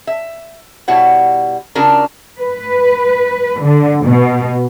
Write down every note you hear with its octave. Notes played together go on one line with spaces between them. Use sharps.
E5
B2 G3 E4 F#4 C#5 F#5
C#3 C#4 D4 F4 F#4 A#4
B4
D3
B2